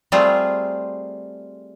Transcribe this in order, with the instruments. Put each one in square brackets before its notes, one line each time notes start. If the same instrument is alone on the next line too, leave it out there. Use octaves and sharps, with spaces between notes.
[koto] G3 A3 C4 F4 G#4